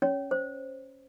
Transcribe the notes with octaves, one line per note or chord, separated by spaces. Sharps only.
C#4 C#5
C5